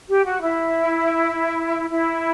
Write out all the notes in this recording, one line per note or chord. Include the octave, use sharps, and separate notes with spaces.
G4
F#4
E4
E4